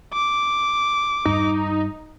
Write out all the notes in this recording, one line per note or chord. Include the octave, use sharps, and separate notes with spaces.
D6
E2 G2 D#4